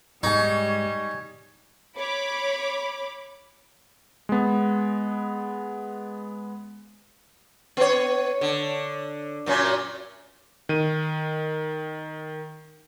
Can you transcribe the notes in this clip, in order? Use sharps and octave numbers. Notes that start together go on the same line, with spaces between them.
G#2 G3 D#4 C#5 G#5
C#5 B5 D6
G#3 B3
B3 C#5
D3
F#2 A#2 C#4
D#3 D#7